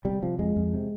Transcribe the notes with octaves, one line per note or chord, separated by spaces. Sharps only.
C3 G3
C3 F3
F2 G#3
F2
C3